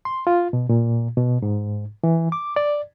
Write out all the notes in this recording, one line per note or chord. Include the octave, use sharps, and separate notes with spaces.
C6
F4
B2
A#2
B2
G#2
E3
D6
D5